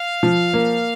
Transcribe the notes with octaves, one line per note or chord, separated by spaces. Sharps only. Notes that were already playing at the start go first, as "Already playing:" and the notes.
Already playing: F5
F3
A#3